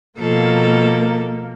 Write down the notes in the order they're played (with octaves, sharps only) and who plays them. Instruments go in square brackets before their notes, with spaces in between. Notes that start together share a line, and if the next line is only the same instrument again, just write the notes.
[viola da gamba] B2 F3 A4 [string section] A#3